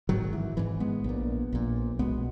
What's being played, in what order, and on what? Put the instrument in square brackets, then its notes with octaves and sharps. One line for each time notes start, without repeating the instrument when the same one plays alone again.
[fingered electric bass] G#1 G#2 D#3 F#3
E3
G#1 G#2 E3
G#3 B3
A#1 A#2
A#1 A#2
B1 B2 G#3 B3